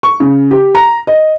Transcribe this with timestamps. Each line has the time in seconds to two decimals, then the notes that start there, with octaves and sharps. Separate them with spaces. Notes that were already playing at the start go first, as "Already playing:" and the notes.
0.03 C#6
0.20 C#3
0.51 G4
0.75 A#5
1.07 D#5